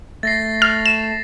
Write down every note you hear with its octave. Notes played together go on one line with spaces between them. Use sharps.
A3 A6 A#6 C7
F6
E7